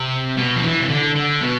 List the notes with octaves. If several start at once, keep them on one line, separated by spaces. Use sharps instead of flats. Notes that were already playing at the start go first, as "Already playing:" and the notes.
Already playing: C3
B2
F3
E3
C3
D3
D3
B2